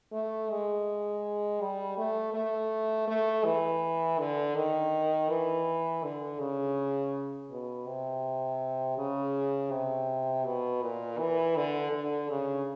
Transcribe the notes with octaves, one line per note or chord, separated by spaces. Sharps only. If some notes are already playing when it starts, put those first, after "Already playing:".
A3
G#3
G3
A3
A3
A3
E3
D3
D#3
E3
D3
C#3
B2
C3
C#3
C3
B2
A#2
E3
D3
D3
C#3